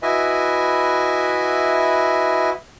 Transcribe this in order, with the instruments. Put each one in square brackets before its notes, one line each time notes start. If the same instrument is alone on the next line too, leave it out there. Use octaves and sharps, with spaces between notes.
[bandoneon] E4 F#4 B4 D#5 E5 G#5